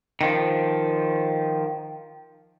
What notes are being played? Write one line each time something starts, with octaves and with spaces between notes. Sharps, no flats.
D#3 F3